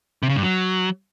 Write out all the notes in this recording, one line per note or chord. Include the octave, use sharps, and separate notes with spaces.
C3
C#3
G2
F#3